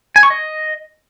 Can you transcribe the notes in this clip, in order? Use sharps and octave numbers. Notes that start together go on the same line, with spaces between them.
G#5
C#6
D#5